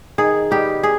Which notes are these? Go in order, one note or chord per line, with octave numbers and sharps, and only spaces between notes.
D#3 G#4
G3 B3 D#4 G4
G#4